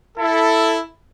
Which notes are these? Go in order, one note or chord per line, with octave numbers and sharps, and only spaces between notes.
E4 A4